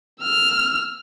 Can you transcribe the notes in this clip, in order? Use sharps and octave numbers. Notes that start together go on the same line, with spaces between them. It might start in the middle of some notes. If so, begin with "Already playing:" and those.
E6 F6